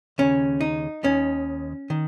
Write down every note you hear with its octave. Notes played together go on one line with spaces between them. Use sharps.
D#2 C#3 C#4
D#4
D#2 D#3 C#4
D#3